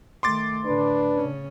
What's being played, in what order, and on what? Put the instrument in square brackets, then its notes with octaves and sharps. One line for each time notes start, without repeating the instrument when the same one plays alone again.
[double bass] D#3 A3 [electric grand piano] C6 D6 A6
[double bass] A2 D3 [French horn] D4 [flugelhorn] B4
[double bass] C#3 C#4